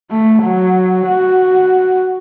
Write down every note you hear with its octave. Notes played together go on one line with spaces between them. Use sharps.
A3
F#3
F#4